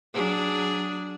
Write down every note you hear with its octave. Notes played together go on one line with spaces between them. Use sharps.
F#3 D4 G#4